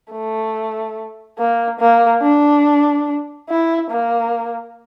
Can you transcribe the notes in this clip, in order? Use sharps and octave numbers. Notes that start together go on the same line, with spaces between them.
A3
A#3
A#3
D4
E4
A#3